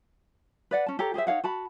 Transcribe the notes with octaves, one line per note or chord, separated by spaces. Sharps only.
B4 D5 F#5
C#4 A5
G4 A4 C#5 A#5
G4 G#4 C5 E5
D#4 C#5 F5 F#5
F#4 A5 B5